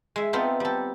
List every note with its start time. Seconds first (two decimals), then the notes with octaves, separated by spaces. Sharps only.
0.16 G#3 E5
0.33 B3 C4 D#4 F4 A4 E5
0.60 G3 A4